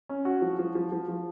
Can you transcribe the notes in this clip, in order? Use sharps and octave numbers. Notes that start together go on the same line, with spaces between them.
C#4
F#4
F3
F3
F3
F3
F3